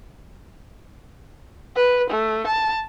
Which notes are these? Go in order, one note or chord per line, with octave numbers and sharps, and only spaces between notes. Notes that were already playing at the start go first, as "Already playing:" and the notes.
B4
A3
A5